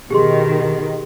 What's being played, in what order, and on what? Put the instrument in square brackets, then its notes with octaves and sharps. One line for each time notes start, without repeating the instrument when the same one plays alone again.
[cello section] B2 D#3 [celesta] G4 G#4 C6